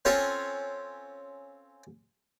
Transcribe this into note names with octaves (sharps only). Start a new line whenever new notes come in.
C4 C#4 F4 A4 C#5